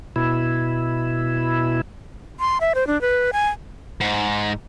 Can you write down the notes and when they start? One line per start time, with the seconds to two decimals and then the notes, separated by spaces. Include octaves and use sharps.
0.16 B2 E4
2.40 C6
2.61 E5
2.75 C5
2.87 D4
3.01 B4
3.33 G#5
4.00 G#2